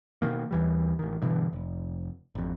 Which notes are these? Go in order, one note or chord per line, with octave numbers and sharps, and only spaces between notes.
B2 D#3 A#3
D#2 E3 G3
A1 D#3
G2 B2 D3 E3
F1
G#1 F2